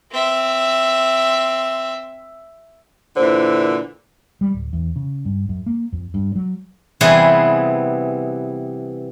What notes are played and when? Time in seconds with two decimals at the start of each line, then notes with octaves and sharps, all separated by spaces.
0.11 C4 E5
3.17 A#2 D3 E3 C5
4.41 G3
4.54 D1
4.73 E2
4.96 C#3
5.25 G2
5.49 F#2
5.66 A#3
5.93 F2
6.14 G2
6.35 F#3
7.01 C3 E3 G3 B3 G#4